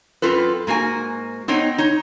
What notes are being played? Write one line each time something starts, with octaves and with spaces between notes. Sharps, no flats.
F#2 C4 F4 A4 B4
G#2 A#3 F#4 G#5
B3 C4 D#4 C#5 D#5
D#4 C#5